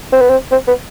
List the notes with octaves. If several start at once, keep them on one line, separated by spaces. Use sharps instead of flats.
C4
B3
C4
C4
B3